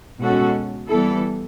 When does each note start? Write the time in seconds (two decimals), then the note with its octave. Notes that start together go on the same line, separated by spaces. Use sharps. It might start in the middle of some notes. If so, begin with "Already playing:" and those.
0.19 B2 G#3 C#4 F#4 A4
0.89 E3 G3 B3 E4 A4